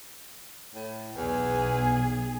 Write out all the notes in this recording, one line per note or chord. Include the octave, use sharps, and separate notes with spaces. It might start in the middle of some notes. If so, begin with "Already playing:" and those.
A2
B1 E2 G#4